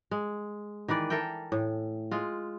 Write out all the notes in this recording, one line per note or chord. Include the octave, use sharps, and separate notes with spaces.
G#3
D#3 E3 B4 D5
A4 A#4 E5 G5
A2
G#3 F4